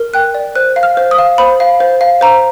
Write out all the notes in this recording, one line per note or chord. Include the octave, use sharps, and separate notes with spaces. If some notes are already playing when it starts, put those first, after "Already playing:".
Already playing: A#4
G5 F#6
D5
C5 F#6
F5
F6
C5
D#6
F5
C5 B5
F5
C5
F5
C5 A#5